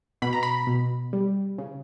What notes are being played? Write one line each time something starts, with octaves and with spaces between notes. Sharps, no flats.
B2 B5
A#5
B5
B2
G3
C#3